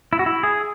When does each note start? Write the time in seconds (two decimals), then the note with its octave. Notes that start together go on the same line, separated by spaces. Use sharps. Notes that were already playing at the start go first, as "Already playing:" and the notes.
0.13 E4
0.19 F#4
0.26 E4
0.43 G#4